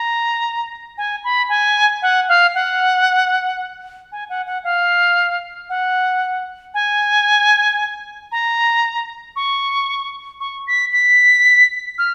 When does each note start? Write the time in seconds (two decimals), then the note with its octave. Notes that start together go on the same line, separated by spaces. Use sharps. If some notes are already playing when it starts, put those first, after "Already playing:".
Already playing: A#5
0.98 G#5
1.24 B5
1.49 G#5
2.02 F#5
2.29 F5
2.55 F#5
4.12 G#5
4.30 F#5
4.46 F#5
4.64 F5
5.69 F#5
6.74 G#5
8.32 A#5
9.36 C#6
10.40 C#6
10.67 B6
10.93 B6
11.98 F6